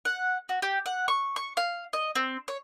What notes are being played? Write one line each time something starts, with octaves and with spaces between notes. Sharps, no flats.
F#5
F#4
G4
F#5
C#6
C#6
F5
D#5
C4
C#5